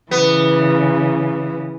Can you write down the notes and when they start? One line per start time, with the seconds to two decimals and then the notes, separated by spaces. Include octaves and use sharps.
0.11 C#3 E3 B3